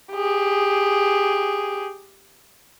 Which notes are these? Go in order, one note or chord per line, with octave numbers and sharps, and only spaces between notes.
G4 G#4